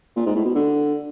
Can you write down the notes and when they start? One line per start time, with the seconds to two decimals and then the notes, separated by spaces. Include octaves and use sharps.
0.16 A#2
0.26 G#2
0.36 A2
0.45 B2
0.55 D3